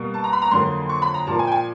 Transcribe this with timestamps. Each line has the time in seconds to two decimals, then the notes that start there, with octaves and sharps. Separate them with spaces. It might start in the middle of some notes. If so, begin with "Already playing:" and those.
Already playing: B2 G3 A#3
0.14 A5
0.24 A#5
0.33 B5
0.42 A#5
0.51 F2 D3 F#3 A#3 C6
0.89 C#6
1.02 B5
1.14 A#5
1.27 A#2 F3 A#3 A5
1.39 G#5
1.47 G5
1.52 G#5